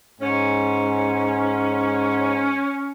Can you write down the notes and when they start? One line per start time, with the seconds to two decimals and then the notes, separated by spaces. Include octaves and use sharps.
0.21 G#2 C#4